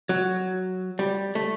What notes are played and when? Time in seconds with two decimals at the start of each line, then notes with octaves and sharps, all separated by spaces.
0.09 F#3
0.99 G3
1.35 A3